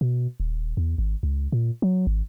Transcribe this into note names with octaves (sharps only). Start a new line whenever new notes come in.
B2
D#1
E2
G#1
C#2
A#2
F#3
G#1